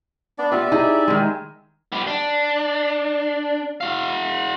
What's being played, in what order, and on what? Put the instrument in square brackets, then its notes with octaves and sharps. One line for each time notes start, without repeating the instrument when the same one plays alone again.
[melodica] B3 D4 D5
[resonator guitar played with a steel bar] B3 F4 [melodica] G4 D5 E5
[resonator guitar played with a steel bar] D#4 E4 G#4
D#3 G#3
[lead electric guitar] B3 G4
D4
F#4 F5